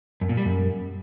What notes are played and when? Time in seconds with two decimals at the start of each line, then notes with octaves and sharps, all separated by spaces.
0.21 F#2
0.29 A#2
0.37 G3
0.45 F#2